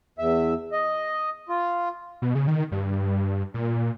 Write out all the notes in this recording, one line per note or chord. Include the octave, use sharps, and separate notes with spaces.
E2 E5
D#5
F4
B2
C#3
D#3
G2
A#2